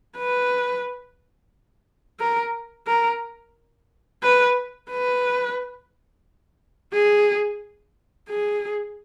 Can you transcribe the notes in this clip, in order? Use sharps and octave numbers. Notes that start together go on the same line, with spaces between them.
B4
A#4
A#4
B4
B4
G#4
G#4